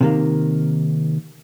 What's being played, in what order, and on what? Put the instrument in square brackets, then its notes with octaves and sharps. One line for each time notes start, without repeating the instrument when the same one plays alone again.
[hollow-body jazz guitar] C3 D#3 A#3